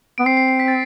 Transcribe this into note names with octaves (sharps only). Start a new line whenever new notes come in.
B3 D7
C4 C7
C7
C7
B6
A6